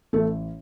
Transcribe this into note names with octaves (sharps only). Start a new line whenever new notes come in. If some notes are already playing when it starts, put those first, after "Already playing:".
A1 A3 A4